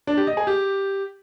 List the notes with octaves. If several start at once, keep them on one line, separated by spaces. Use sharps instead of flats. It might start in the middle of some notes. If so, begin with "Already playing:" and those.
D4
G4
D#5
G#4
G4